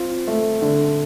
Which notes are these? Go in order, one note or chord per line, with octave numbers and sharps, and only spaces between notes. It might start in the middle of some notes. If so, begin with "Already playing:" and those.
Already playing: C4 F4
A3
D3